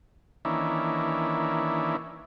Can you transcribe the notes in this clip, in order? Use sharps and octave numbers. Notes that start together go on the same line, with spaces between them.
D#3 E3 A#3 C#4 D4 E4